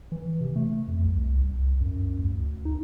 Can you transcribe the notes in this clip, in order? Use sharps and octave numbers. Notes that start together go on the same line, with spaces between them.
E3
C3
A3
F2
C2
C2
F#2
D2
D#4